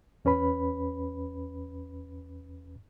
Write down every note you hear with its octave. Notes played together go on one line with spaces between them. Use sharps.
E2 C#4 B4 B5